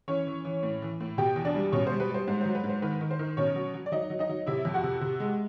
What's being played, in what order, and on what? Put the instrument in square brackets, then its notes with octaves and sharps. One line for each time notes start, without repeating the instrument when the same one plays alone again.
[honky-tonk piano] E3 C#4 C#5
E3
E3
A2
E3
A2
B2 G4 G5
E2
D4 D5
G3
B2 C#4 C#5
C5
G3
B4
G3 C5
G#2 C5
F#3 C5
B4
G#2
C5
D#3 B4
D#3
C5
D#3
B2 C#4 C#5
F#3
F#3
D5
F#3 D#4 D#5
F#3
D#4 D#5
F#3
C3 E4 E5
F2
F#4 F#5
C3
C3
G#3